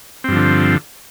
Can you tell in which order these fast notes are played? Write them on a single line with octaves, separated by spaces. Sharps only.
C4 G2 F3 D3